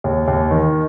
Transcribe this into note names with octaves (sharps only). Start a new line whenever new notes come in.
D#2
D#2
D#3